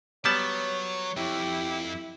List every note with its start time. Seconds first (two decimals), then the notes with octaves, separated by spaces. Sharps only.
0.25 F#3 G3 B3 C#5 A5
1.17 F2 E4 G4